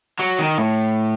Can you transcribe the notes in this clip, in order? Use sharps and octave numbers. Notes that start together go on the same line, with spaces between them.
F#3
D#3
A2